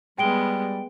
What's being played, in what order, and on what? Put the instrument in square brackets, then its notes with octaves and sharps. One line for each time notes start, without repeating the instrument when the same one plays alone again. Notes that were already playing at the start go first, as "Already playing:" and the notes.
[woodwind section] G3 [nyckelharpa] G#3 B3 [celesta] G5 D7 G7